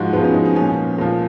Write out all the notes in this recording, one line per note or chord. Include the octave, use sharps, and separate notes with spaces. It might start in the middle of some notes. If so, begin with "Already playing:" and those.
Already playing: G#2 F3 G#3 F#4
G#2 F3 B3
C#4
D#4
C#4
A#2 F3 C#4
A#2 F3